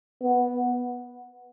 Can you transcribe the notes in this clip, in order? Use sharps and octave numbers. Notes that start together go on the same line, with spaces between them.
B3